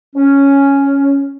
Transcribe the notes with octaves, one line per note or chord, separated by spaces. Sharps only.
C#4